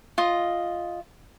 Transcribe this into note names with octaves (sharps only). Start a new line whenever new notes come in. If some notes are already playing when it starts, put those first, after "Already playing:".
F4 D#5